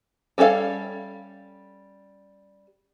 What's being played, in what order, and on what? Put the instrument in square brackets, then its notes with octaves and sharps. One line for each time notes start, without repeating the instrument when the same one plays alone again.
[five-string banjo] G3 C#4 A4 C#5 F5